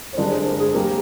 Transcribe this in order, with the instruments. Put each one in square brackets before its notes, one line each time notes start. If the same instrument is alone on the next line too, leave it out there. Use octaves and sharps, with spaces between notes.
[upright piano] C5
[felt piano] G2 D3 G#3 D4 [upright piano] A#4 D5
[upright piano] G#4 C5
A#4
G#4
[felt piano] G3 A#3 [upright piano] A#4